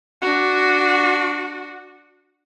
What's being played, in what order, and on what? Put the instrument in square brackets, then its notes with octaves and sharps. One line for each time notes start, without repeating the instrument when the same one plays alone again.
[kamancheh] D4 F#4